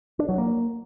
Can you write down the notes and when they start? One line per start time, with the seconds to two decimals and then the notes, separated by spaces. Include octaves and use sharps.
0.19 D4
0.29 F#3
0.38 A#3